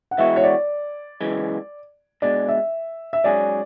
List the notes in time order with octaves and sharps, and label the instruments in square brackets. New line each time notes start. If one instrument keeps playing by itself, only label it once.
[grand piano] F#5
[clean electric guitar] E3 G#3 B3 F#4 [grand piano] E5
[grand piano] C#5
D5
[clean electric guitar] F#2 C#3 E3 G#3
[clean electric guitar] B2 G#3 D4 [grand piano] D5
[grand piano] E5
E5
[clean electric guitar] G#2 F#3 C#4 G#4 [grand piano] D5